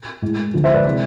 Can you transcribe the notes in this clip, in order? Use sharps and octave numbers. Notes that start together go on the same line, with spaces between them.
A2 G#3
D2 D3 F3 G#3
C5 E5
B4 D5
C3 E3 G#3